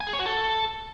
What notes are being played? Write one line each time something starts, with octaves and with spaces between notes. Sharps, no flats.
G#5
G#4
C#5
F#4
A4